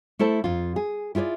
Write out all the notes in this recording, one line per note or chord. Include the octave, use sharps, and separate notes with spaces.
A3 E4 A4 C5 A5
F2 F4
G#4
E4 F4 G#4 C5 D5